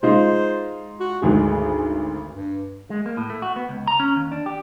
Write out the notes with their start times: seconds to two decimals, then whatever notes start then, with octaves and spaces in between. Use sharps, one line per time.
0.03 G#3 D#4 F4 C5
1.00 F#4
1.22 G#1 D2 G#3 G#4
2.33 G2
2.90 G#3
3.06 A#3
3.17 A2
3.30 A3
3.42 F#4
3.56 B3
3.69 C#2
3.87 A#5
4.00 C#4
4.16 D#2
4.32 D4
4.46 G4